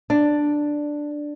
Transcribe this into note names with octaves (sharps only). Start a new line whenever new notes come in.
D4